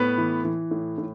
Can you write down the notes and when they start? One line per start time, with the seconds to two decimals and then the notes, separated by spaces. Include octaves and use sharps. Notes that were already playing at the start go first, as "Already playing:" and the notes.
Already playing: A2 B3 B4
0.18 E3
0.45 E3
0.71 A2
0.98 A2